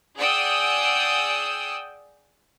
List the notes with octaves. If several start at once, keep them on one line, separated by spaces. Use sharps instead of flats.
G#4 D5 F#5 G5 D#6 E6